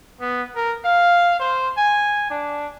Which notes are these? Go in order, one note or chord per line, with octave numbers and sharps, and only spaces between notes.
B3
A#4
F5
C5
G#5
D4